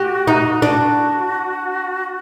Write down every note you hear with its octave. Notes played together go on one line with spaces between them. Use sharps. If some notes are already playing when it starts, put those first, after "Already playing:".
Already playing: F#4 G4
D#4
D4 F#4